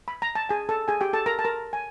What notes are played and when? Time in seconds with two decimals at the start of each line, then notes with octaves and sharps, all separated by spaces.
0.08 B5
0.22 A#5
0.35 A5
0.49 G#4 G#5
0.69 A4 A5
0.88 G#4 G#5
1.01 G4 G5
1.13 A4 A5
1.26 A#4 A#5
1.39 A5
1.44 A#4 A#5
1.73 G#5